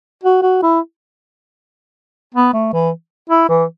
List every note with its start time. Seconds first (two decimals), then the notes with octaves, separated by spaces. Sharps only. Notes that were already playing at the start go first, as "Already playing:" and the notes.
0.23 F#4
0.42 F#4
0.62 E4
2.34 B3
2.53 A3
2.73 E3
3.30 E4
3.49 E3